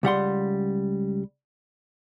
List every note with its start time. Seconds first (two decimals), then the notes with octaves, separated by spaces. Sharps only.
0.03 C#2 G3 F#5 C6